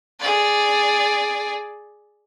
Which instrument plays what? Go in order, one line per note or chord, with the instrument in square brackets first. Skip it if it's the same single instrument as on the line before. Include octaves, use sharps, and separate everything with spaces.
[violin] G#4 D5